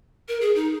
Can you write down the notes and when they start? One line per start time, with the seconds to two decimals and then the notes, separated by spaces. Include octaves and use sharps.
0.28 A#4
0.41 G#4
0.55 D#4